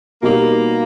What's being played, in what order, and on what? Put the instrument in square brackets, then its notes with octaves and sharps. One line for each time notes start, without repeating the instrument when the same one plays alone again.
[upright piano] B2 G3 B3 D#4 G4 [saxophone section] A#3